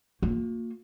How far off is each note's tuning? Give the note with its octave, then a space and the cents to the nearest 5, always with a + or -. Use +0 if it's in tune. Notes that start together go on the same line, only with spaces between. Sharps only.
A#3 -20 F4 +40